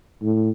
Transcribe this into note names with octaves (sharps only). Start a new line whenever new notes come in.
A2